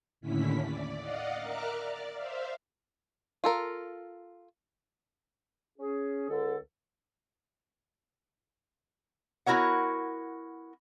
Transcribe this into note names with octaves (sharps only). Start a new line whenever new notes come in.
D#2 A2 D3 C#4 E4 B6
D5
D5 D#5 F5 F#5
A#4 E5 A#5 D6 F6 F#6
D5
C5 E5 F5
F4 A4 A#4
C#4 G#4
C#2 D3 A4
B3 E4 F#4 A#4 C#5 F#5